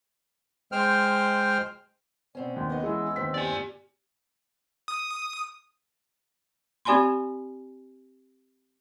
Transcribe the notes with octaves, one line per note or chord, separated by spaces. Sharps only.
G#3 C5 G5 F6
B2 C4 C#4 D5
D#2 C6
B3 C#4 A#4 D#5
E3 G#3 E6
D#2 C4 B6
G4 D5 G#5
D#6
C4 G4 D5 G#5 B5 C6